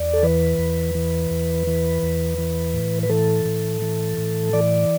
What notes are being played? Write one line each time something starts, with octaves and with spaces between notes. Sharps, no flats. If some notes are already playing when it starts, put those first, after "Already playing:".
Already playing: E2 D5
A4
E3 B4
E2
E3
E2
E3
E2
E3
A2
B4
E3 A4
A2
E3
A2
E3 D5